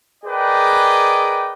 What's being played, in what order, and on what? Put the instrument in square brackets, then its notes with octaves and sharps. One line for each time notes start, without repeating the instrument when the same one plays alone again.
[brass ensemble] G#4 A#4 B4 D5 D#5 G5